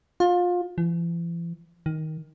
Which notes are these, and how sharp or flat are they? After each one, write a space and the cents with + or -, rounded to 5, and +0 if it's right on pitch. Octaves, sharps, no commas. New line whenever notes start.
F4 +25
E3 +45
D#3 +10